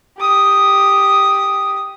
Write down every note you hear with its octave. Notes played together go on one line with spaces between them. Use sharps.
G4 D#6